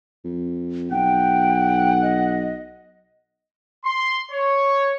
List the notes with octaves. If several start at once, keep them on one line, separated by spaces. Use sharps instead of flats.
F2
B1 F#5 G5
D#5
C6
C#5